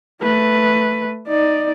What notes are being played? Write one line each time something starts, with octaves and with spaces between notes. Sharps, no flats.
A3 B4
D#4 D5